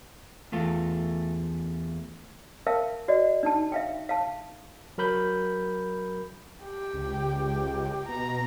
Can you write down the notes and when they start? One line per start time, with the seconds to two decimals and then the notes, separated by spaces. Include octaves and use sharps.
0.52 E2 A3 F4
2.67 A#4 E5 F5 G5 A5
3.08 F#4 D5 D#5
3.43 D4 D#4 A5
3.72 E5 F5 G5
4.09 F5 A5
4.98 F#3 A#4 B5 G6
6.64 G4
6.94 C#2
8.08 B2 A#5